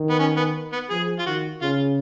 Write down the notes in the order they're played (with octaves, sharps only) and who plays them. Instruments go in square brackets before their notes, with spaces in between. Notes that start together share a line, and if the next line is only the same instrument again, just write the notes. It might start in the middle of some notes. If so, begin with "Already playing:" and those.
Already playing: [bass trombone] D#3
[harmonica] B3
C#4
B3
B3
[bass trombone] F3 [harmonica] G#4
[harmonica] F4
[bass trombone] D#3 [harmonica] F#4
[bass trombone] C#3 [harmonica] F4